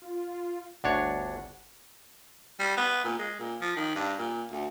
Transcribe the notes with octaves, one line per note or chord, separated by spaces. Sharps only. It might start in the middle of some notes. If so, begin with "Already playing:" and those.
F4
G1 D2 D4 C#5 F#5
G3
B3
A#2
G#3
A#2
F3
D#3
G2
A#2
D2